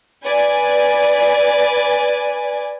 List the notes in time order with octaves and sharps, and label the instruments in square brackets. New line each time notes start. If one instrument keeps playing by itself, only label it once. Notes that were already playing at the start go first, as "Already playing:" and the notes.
[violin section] B4 D5 G#5